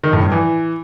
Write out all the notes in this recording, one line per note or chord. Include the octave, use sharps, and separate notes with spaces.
D#3
A2
G2
E3